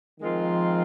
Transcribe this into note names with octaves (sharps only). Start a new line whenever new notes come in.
D#3 F3 G#3 C4 F4 A#4